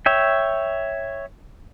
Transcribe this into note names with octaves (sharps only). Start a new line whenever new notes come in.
C#5 E5 G5